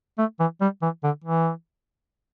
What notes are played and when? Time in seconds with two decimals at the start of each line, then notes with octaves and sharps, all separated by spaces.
0.18 A3
0.40 E3
0.61 G3
0.82 E3
1.04 D3
1.24 E3